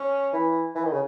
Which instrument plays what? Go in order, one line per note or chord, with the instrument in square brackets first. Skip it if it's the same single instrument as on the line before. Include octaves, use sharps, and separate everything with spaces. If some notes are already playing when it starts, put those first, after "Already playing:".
Already playing: [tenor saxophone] C#4
[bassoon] E3
E3
D#3
C#3